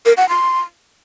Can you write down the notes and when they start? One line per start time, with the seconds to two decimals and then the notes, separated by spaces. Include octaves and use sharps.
0.06 A#4
0.17 F#5
0.29 C6